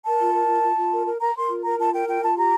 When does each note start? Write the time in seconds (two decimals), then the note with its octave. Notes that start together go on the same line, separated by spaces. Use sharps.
0.05 A#4 A5
0.20 F4
0.33 A#4
0.48 F4
0.63 F4
0.77 F4
0.92 A#4
1.06 A#4
1.20 A#4 A#5
1.35 A#4 C6
1.50 F4
1.64 A#4 A#5
1.79 F4 A5
1.93 A#4 G5
2.07 F4 G5
2.22 F4 A5
2.36 G4 A#5